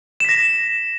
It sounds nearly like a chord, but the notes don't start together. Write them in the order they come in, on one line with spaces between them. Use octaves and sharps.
E7 B6 A#6